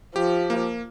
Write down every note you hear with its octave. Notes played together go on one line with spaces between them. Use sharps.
F3 G4
A#3